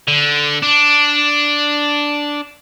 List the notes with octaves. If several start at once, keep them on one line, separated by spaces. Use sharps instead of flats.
D3
D4